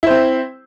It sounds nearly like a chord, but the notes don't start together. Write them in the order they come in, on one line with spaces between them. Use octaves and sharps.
E4 C5 C4